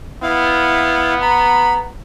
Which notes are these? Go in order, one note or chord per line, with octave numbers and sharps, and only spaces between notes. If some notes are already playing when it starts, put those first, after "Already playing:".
B3 E4 F5
A#5 B5